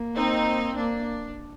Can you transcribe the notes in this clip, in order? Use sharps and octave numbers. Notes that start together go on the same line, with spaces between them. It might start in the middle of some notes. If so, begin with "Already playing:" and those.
Already playing: A#3
C4 D#4
A#3 D4